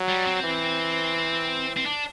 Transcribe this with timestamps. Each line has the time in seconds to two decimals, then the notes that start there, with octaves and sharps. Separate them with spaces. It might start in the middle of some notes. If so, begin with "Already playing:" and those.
Already playing: F#3
0.09 G3
0.27 C4
0.44 E3
1.77 C4
1.86 D4